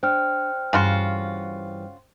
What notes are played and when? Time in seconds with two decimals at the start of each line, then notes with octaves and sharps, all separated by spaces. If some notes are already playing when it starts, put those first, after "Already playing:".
0.03 D4 C5 G5 F6
0.73 G2 C#3 E3 F4 F#4